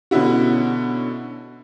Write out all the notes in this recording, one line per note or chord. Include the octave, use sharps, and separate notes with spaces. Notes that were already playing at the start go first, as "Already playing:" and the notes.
B2 D3 C#4 E4 F#4